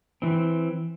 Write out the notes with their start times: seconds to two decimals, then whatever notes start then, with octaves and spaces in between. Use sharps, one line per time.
0.22 E3 C4